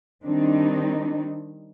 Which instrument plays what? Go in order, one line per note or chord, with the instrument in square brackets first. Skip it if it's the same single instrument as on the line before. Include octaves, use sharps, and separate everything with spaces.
[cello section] D#3 G3 C4 D4 D#4